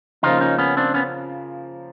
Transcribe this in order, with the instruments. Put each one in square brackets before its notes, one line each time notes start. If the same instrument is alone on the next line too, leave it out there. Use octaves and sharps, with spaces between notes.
[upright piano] C#3 F3 A#3 [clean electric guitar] D#4 F4
[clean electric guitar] C#4 D#4
B3 C#4
C4 D4
B3 C#4